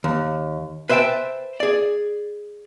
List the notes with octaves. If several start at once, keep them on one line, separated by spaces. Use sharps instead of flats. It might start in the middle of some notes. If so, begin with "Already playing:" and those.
D#2
B4 C5 E5 F#5 G5 A5
G#4 D5